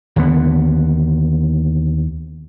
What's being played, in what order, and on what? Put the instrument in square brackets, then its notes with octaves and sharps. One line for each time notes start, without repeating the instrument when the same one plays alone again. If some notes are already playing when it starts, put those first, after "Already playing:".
[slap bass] D#2 D3 B3